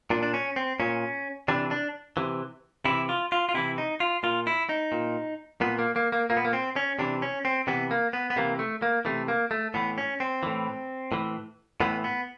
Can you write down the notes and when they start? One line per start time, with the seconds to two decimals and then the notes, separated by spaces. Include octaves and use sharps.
0.10 A#2 D4
0.23 D4
0.34 C#4
0.56 C4
0.80 A#2 C#4
1.48 C3 E3 D4
1.71 D4
2.17 C3 E3
2.85 C3 E3 E4
3.09 F4
3.32 F4
3.49 F4
3.54 C3 E3 E4
3.78 D#4
4.00 F4
4.23 A#2 F4
4.47 E4
4.69 D#4
4.92 A#2
5.61 A#2 B3
5.79 A#3
5.96 A#3
6.12 A#3
6.30 A#2 A#3
6.37 B3
6.45 A#3
6.53 C4
6.76 C#4
6.99 C3 E3 D4
7.22 C#4
7.45 C4
7.67 C3 E3 B3
7.91 A#3
8.13 B3
8.30 B3
8.36 C3 E3 A#3
8.59 A3
8.82 A#3
9.05 C3 E3 A3
9.28 A#3
9.51 A3
9.74 A2 E3 B3
9.98 C#4
10.20 C4
10.43 A2 E3
11.12 A2 E3
11.80 A2 E3 B3
12.04 B3